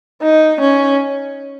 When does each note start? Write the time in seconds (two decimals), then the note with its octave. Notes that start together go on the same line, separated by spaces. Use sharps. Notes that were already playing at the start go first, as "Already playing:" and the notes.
0.22 D#4
0.61 C#4